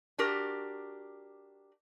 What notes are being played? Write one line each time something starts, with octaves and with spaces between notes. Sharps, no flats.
D4 F#4 G4 A#4